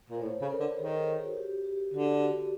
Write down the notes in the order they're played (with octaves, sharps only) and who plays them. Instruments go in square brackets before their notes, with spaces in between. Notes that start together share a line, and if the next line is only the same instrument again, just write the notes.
[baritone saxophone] A#2
[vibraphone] C5
[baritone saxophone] A2 [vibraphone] C#5
[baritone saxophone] C#3 [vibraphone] A4
[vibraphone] A#4
[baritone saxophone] D3
[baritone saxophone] D#3 [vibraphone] G#4
[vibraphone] G#4
F#4
G4
G4
[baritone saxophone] D3 [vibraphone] F#4
[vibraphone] G4
F#4